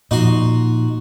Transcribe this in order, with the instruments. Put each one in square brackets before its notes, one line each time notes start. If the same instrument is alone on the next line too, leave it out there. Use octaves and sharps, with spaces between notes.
[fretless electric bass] A#2 F3 [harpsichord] D#4 F#4 C6